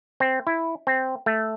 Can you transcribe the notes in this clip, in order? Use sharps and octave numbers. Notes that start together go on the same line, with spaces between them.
C4
E4
C4
A3